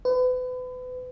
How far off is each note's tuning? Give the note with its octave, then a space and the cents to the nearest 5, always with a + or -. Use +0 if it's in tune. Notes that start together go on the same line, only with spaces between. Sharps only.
B4 +35